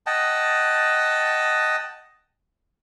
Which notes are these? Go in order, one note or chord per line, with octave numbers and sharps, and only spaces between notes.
D#5 F#5 G5 A5